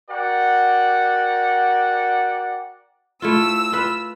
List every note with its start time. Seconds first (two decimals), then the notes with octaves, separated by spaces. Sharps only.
0.10 F#4 A#4 D5 F#5 G5
3.22 A3 E4 F4 E6
3.72 F4 B4